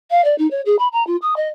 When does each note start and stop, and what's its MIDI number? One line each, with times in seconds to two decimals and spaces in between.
0.11 0.24 77
0.24 0.37 74
0.38 0.49 63
0.51 0.61 73
0.65 0.76 68
0.79 0.88 83
0.92 1.05 82
1.07 1.16 65
1.22 1.34 87
1.36 1.48 75